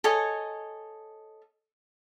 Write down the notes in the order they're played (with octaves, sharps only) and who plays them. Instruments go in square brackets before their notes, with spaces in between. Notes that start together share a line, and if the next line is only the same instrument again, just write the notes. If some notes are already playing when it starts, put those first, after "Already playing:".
[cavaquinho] A4 C#5 D#5 G#5